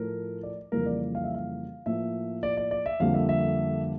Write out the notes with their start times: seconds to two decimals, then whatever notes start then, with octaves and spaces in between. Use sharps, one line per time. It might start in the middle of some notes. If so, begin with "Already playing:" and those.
Already playing: A2 F3 A3 A#4
0.43 D5
0.72 F2 C#3 E3 G3 A#3 A#4
0.86 D5
1.15 F5
1.24 E5
1.34 F5
1.86 A2 F3 A#3 E5
2.43 D5
2.57 D5
2.71 D5
2.86 E5
3.00 F2 D3 G3 A#3 F5
3.14 E5
3.29 E5